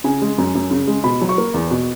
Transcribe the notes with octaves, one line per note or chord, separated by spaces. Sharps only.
C#3 G#5
G#3
F#2
F#2
C#3
G#3
B2 B5
F#3
C#6
A#3
E2
B2